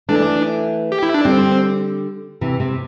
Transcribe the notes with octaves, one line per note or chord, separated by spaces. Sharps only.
E3 A3 D4
G4
E4
D4
D3 G3 C4
C3 E3
C3